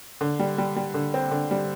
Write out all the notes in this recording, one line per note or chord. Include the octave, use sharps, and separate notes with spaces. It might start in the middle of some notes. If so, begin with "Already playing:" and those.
D3
G3
G3
G3
D3
C4
D3
G3